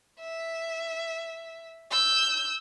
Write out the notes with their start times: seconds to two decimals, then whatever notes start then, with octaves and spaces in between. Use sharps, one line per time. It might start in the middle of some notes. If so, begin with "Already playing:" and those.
0.20 E5
1.91 E6 G6